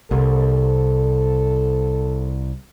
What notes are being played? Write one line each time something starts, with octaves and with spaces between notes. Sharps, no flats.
C2 A4